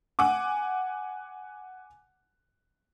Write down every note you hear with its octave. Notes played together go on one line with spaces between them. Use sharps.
F#5 G#5 D6